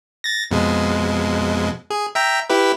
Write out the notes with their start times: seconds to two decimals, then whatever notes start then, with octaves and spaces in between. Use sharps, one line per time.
0.24 A6 A#6
0.51 F2 B2 G#3
1.90 G#4
2.15 E5 G5 A#5
2.50 E4 G4 B4